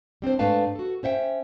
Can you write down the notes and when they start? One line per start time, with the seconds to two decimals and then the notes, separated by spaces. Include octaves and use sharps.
0.22 G3 C4 D4 C5
0.39 G#2 A3 D4 B4 F5 A5
0.75 F#4 A4
1.03 C#4 C5 E5 F#5 G5